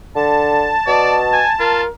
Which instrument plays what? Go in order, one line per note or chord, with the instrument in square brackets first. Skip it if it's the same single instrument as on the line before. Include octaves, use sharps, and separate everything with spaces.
[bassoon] D3 [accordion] A5
[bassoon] B2 [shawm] D5
[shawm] G#5
[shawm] F4 [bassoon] A#4